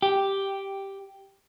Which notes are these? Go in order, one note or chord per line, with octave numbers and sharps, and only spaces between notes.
G4